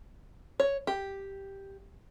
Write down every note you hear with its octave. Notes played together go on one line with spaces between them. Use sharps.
C#5
G4